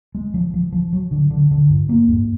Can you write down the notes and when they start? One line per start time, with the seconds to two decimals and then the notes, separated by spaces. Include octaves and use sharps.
0.15 G#3
0.34 F3
0.54 F3
0.72 F3
0.93 F#3
1.11 D3
1.31 D3
1.51 D3
1.70 G2
1.89 A#3
2.09 G2